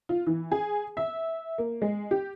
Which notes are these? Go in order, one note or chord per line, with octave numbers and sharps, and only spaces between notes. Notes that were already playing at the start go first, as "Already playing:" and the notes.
F4
E3
G#4
E5
A#3
G#3
G4